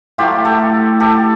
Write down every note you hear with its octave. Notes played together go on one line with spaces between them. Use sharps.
A2 F#3 A3 F4 G4
G4 A4
G4 A4